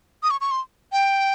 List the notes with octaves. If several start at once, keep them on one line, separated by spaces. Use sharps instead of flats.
D#6
C#6
C#6
C6
G5